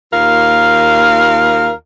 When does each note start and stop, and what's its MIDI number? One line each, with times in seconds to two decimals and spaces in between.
0.13 1.72 39
0.13 1.72 65
0.13 1.72 70
0.13 1.72 77